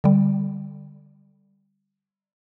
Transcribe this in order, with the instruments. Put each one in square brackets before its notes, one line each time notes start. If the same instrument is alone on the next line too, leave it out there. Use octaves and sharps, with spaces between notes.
[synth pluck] D3 G3